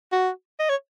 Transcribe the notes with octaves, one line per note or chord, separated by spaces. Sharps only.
F#4
D#5
C#5